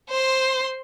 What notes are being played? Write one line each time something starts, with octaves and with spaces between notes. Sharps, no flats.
C5 C6